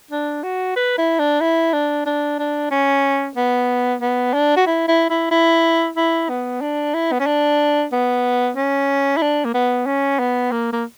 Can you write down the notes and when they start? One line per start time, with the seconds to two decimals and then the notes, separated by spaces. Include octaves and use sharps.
0.11 D4
0.43 F#4
0.76 B4
0.98 E4
1.19 D4
1.41 E4
1.73 D4
2.06 D4
2.39 D4
2.71 C#4
3.36 B3
4.01 B3
4.34 D4
4.57 F#4
4.66 E4
4.88 E4
5.10 E4
5.31 E4
5.97 E4
6.29 B3
6.61 D4
6.94 E4
7.12 B3
7.20 C#4
7.26 D4
7.92 B3
8.56 C#4
9.17 E4
9.22 D4
9.45 A#3
9.54 B3
9.86 C#4
10.19 B3
10.52 A#3
10.73 A#3